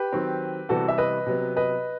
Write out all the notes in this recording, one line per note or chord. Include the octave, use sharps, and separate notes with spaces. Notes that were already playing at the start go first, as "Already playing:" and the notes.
Already playing: G4 B4
D#3 F#3 C4
C3 E3 G3 B3 F#4 A4
E5
B4 D#5
C3 F#3 B3
B4 D#5